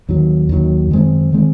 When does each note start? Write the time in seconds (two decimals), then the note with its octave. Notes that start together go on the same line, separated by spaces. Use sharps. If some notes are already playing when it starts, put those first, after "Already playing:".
0.09 D#2 D#3 F#3
0.49 D#2 D#3 F#3
0.90 F#2 D#3 G#3 C4
1.33 D#3 G#3 C4